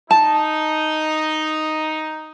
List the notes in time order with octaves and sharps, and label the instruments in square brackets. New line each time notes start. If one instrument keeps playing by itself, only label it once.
[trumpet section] D#4 [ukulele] A5